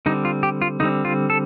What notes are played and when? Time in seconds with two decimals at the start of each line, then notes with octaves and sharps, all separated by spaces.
0.06 D3 G3 C4 D#4
0.25 F4
0.43 G4
0.62 F4
0.80 D3 G3 C4 D#4
1.05 F4
1.30 A4